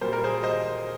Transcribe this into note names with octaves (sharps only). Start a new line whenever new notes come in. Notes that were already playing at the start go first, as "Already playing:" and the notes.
A#2 G3 A#3 C5
A#4
G#4 C5
C5 D#5